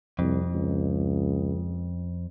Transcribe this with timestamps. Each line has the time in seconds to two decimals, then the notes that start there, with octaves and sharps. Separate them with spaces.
0.19 C2 F2
0.54 C#2